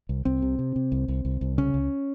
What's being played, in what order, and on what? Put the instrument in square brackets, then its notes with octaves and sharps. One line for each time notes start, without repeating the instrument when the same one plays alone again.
[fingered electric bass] C2
C2 C4
C3
C3
C3
C2
C2
C2
C2
C#3 C#4
C#2